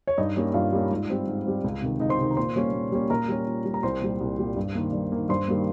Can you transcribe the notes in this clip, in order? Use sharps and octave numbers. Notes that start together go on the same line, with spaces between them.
C#5
G2 D#4 D#5
G3 A#3 C#4
G2 F4 F5
G3 A#3 C#4
G#2
G3 C4
G#2
G3 C4
C#2
C3 D#3
C#2 D#4 D#5
C5 C6
C3 D#3
A#5
A#2 C5 C6
G3 A#3 C#4
A#2
G3 A#3 C#4
A#2 A#4 A#5
G3 C#4
A#2
G3 C#4
A#5
C2 C5 C6
A#2 G3
C2
A#2 G3
G2
D#3 A#3
G2
D#3 A#3
G2 C5 C6
D#3 G3 A#3